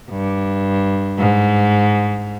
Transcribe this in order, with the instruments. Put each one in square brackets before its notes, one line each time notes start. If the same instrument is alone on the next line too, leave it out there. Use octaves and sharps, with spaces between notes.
[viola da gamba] G2
G#2